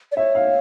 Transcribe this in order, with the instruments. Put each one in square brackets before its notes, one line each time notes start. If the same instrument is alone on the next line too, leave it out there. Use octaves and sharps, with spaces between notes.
[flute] D5
[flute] C#5 [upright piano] E5
[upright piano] F5